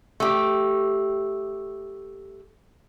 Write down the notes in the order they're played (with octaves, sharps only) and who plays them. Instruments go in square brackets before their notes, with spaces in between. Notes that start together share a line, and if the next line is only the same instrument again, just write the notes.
[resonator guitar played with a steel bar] A3 G4